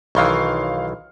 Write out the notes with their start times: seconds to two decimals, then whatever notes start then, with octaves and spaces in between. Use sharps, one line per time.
0.15 B1 D#3 E3 F5 C6 C#6